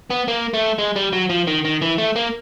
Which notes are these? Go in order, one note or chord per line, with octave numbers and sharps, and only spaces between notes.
B3
A#3
A3
G#3
G3
F#3
F3
D#3
D#3
E3
A3
A#3